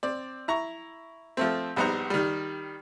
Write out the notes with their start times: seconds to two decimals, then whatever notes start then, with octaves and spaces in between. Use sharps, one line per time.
0.03 C4 D5
0.48 E4 A#5 C#6
1.37 F3 A3 C4
1.76 A#1 G3 B3 D#4 C5 A#5
2.10 D#3 G3